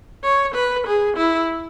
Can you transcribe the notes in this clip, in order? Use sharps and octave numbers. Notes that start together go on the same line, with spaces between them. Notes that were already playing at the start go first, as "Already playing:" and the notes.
C#5
B4
G#4
E4